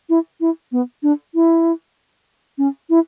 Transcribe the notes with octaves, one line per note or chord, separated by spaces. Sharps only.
E4
E4
B3
D4
E4
C#4
E4